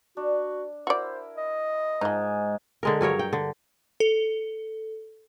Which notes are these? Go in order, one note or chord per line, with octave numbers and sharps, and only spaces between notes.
D4 F#4
E4 F#4 A#4 C5 D5
D#5
G#2 F3 D#4 G#5
D3 G#3 A#4
G2 F#3 A#4 C#5
G5
D3
A4